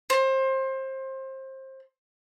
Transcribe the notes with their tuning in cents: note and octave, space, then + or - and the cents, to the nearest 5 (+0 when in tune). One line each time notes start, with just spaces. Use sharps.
C5 +25